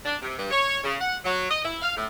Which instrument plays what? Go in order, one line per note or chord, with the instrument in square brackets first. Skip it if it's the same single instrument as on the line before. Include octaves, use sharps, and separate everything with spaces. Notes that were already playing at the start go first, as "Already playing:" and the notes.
[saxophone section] D4
C3
G2
C#5
C#3
F#5
F#3
D#5
E4
F5
A2